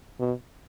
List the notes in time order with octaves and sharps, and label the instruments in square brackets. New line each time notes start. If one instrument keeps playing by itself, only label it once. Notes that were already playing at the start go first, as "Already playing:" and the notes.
[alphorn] B2